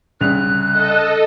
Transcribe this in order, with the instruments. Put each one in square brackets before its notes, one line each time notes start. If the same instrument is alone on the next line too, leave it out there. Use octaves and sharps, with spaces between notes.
[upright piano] C2 C#3 F7 [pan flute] F#6
[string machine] A4 D#5